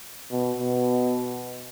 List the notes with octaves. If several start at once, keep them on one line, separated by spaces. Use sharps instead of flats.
B2
B2